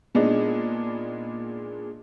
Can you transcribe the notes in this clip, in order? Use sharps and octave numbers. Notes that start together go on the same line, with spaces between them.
A#2 G#3 B3 D4 D#4